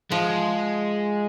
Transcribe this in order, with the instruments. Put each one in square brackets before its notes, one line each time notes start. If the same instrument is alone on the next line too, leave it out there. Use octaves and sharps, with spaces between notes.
[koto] F3 [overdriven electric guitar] G#3